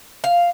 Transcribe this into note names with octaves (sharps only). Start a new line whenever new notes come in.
F5